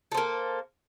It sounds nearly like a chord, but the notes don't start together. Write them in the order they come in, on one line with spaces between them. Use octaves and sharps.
A4 C5 A#3